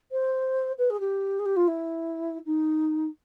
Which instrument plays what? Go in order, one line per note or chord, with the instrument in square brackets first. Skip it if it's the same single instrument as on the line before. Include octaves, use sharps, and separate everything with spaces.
[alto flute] C5
B4
G#4
G4
G#4
G4
F4
E4
D#4